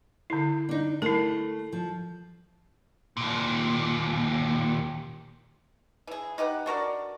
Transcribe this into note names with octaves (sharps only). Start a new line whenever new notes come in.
D3 E4
D4 D#4
A3 E4 A#4
F3
D#2 A#2
E3 G#4
D#4 G4 B4 F#5
D4 F#4 A#4 D5